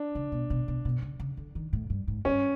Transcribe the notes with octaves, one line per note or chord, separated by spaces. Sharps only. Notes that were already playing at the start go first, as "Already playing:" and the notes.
Already playing: D4
C#3
B2
B2
B2
B2
C#3
C#3
D3
D#3
A2
G2
G#2
G2 C#4